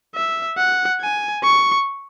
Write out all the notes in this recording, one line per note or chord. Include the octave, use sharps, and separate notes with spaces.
E5
F#5
G#5
C#6